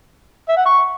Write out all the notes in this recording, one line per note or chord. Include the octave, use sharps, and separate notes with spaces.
E5
F#5
C#6